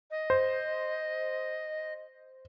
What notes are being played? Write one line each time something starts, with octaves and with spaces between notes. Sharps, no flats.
D#5
C5